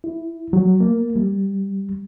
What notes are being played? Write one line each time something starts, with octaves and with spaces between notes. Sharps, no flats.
E4
F#3
A#3
G3